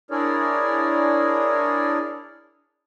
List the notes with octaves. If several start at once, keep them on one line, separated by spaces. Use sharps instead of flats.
D4 E4 G#4 A#4 C#5 D5